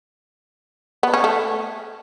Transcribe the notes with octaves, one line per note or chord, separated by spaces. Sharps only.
B3
C#4
A3